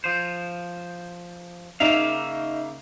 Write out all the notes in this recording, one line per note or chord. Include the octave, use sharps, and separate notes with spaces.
F3 C5
C#3 A#3 D#4 E5 F5 F7